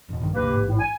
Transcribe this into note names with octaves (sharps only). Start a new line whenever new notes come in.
E1 B2
A#1 G2 D#3
G#1 D2 C3 A#3 G4 B4
A1 G#2
A2
G#5